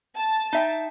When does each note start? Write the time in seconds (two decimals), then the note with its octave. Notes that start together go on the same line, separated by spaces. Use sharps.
0.16 A5
0.53 D#4 E5 G5